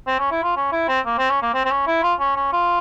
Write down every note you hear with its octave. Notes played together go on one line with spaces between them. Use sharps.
C4
C#4
E4
F4
C#4
E4
C4
A#3
C4
C#4
A#3
C4
C4
C#4
E4
F4
C#4
C#4
F4